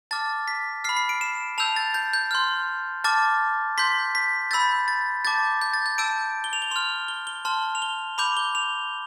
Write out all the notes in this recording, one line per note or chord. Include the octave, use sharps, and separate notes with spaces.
A5 D6 F6 A6
B6
B5 F6 C7
C7
D7
E7
A5 E6 G6 F7
A6
G6
G6
C6 F6
A5 D6 F6 A6
C6 G6 B6
B6
B5 E6 G6 A6
A6
A5 D6 G6 A6
G6
A6
G6
A5 E6 G6 D7
G7
F7
G7
C6 F6 F7
G7
G7
A5 C6 F6
F7
G7
B5 D6 G6 F7
G7
F7